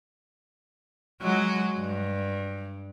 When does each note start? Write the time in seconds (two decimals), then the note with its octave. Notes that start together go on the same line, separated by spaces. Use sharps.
1.22 F#3 G#3 F#4
1.79 G2